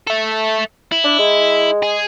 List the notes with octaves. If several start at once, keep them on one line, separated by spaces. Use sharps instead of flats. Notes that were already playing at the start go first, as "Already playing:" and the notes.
A4 E5
E4
D4
G#3
G#4